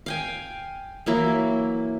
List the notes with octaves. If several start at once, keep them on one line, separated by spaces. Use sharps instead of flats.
F5 G5 G#5
E3 F#3 A#3 E4